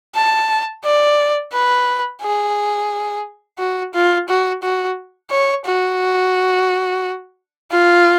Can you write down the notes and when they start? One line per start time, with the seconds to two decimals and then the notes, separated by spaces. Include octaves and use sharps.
0.15 A5
0.85 D5
1.53 B4
2.22 G#4
3.59 F#4
3.94 F4
4.28 F#4
4.63 F#4
5.30 C#5
5.65 F#4
7.71 F4